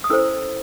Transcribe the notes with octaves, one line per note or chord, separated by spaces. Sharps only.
D#6
C#4 E4 A4 C5 E6